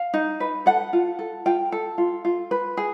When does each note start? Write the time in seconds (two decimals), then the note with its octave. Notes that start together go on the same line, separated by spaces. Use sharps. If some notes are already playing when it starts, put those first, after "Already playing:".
Already playing: F5
0.14 D#4
0.40 B4
0.66 A4 F#5
0.93 F4
1.19 A4
1.46 F4 G5
1.72 A4
1.98 F4
2.25 F4
2.51 B4
2.77 G#4